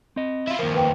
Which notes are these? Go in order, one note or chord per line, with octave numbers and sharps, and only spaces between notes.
C4 D#5
E4 F4
D#2 F3 A#4
F2 A#3 B4 G5